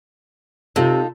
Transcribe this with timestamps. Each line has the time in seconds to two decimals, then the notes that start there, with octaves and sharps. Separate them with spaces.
0.76 C3 D#4 F4 A4